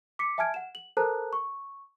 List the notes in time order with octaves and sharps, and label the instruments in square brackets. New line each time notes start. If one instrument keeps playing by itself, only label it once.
[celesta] D6 B6 C#7
E5 G#5 A5 F6 G#6 D7
F#5 E7
F#7
A4 A#4 C5 A5 A#5 F#6
C#6